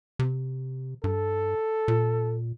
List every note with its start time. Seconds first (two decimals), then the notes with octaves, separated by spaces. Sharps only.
0.19 C3
1.04 G2 A4
1.88 A#2